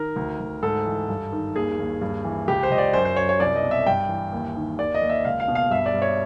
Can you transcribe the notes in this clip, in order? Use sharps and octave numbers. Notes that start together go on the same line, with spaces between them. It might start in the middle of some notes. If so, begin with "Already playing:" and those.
Already playing: D#3 A#4
D2
D2
G#2 A4
E3
G2
D#3
D#2 G#4
D#2
G2
E3
C#2 G4
C5
C#2 D#5
D5
F#2 C5
C5
F#2 C#5
C#5
C2 D5
D#5
B2
E5
G2 G5
E3
D#2
D#3
D#2 D5
D#5
D#2
E5
C#2 F5
F5
B2
F5
G2 E5
D5
G2
C#5